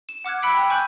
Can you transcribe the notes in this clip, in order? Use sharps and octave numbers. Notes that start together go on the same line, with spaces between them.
E7
F#5 D6 F6 F#6 G#6
B5 E6 F#6 B6 C#7 D7
G5
G#5 C#6 F#6 G6 F#7